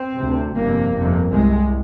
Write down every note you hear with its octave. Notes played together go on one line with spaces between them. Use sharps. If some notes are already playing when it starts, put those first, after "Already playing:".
Already playing: C4
D2 C3
G1 F2 C3 A#3
G1 F2 C3
C2 C3 G#3